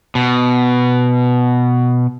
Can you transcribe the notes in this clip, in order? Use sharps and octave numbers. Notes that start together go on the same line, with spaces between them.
B2